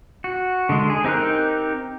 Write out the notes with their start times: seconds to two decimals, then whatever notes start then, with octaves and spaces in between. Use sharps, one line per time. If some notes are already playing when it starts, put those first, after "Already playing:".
0.24 F#4
0.69 D3 G#3
0.90 G#4
1.04 C4 D#4 G4 A#4 F#6